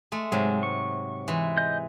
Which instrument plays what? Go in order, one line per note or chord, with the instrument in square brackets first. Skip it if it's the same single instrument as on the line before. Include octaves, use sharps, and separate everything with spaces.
[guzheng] G#3 A3
[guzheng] G#2 C3 F#3 [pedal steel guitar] G#3
[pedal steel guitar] C#6
[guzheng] E3 G#3
[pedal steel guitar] D#5 G6